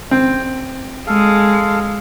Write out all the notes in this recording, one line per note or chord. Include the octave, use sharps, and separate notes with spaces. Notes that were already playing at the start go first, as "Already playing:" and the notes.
C4
G#3 A4 F5